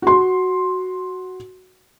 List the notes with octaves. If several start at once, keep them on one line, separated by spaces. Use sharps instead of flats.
F#4 C6